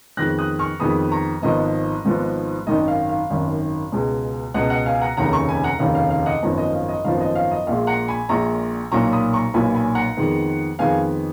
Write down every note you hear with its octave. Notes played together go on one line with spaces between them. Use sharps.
F2 D#3 G#3 B3 F#6 A#6
D#6 F#6
C#6 F6
F2 D#3 G#3 B3 B5 D#6
A#5 C#6
G#1 G#2 F3 B3 D#5
G#1 G#2 F3 B3
G#1 F#2 D#3 D#5
F5
F5
G#1 F#2 D#3
C#2 B2 G#3
C#2 B2 G#3 D#5 F#5
D#5 F#5
F5 G#5
F#5 A#5
F1 D#2 C#3 F#5 A#5
A#5 C#6
G#5 B5
F#5 A#5
F1 D#2 C#3 F5
F5
F5
D#5 F#5
G#1 F#2 F3 B3
D#5
F5
D#5
G#1 F#2 F3 B3 F5
D#5
F5
D#5
A#1 A#2 G#3 F5
F#5 A#5
G#5 B5
A#1 A#2 G#3 A#5 C#6
B1 A#2 F#3 A#3 A#5 C#6
B5 D#6
A#5 C#6
B1 A#2 F#3 A#3 G#5 B5
G#5 B5
F#5 A#5
F2 D#3 G#3 B3
F2 D#3 G#3 B3 F5 G#5